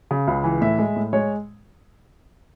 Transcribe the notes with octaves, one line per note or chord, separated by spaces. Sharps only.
C#3
C#2
E3
A2 E5
G#3
A2
G#3 C#5